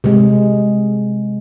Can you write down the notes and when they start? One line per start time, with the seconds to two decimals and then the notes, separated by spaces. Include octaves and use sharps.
0.04 C3 G#3